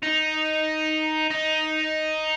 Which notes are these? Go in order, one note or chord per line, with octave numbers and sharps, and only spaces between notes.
D#4
D#4